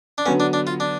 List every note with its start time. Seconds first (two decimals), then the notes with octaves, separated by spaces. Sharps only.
0.18 D4
0.26 D3 F#3 B3 C#4
0.40 D4
0.53 D4
0.67 F4
0.80 D4